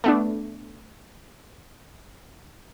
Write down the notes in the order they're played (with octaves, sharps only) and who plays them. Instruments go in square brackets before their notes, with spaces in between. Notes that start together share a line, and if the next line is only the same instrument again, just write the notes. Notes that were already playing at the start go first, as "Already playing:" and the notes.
[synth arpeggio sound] A3 B3 D4